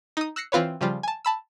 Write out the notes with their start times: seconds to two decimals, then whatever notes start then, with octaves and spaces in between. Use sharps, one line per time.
0.17 D#4 D#6
0.36 E6 F#6 A#6 C7 C#7
0.52 E3 C4 F4 B4 C#5
0.81 C#3 F3 G3 F4
1.03 G#5 A5
1.25 A5 B5 E6